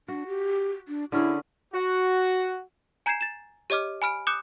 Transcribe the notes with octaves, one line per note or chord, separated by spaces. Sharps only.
D4 F#4
G4
D4
D3 C#4 E4 G#4
F#4
G#5 A#5 G6 G#6 C7 E7
A6 E7
G4 C#5 D#5 D6 F6
G#5 B5 F6 D7
D6 D#6 F#6 G6 C#7 E7